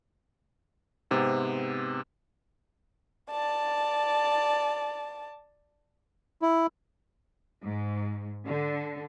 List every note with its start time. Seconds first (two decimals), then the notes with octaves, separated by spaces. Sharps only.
1.11 G#2 C3 B3 C4
3.31 D5 A5
6.42 E4
7.63 G#2
8.46 D3